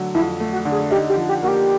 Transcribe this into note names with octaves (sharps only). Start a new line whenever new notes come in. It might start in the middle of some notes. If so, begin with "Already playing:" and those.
Already playing: D3 F#3 A3
F2 E4
A3
F#4
D3
G#4
D#4 G4
G4
F3
G4
A#3 F#4
G4